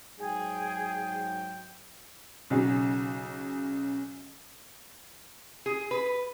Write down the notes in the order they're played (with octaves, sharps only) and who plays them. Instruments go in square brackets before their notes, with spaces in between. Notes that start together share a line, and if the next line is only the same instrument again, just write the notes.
[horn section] G#2 F#3 G5 [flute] G#4
[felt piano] B1 C#3 F#3
[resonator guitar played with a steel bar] G#4
B4